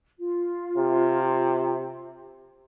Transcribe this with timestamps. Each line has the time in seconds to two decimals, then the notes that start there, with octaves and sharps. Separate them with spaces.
0.19 F4
0.77 C3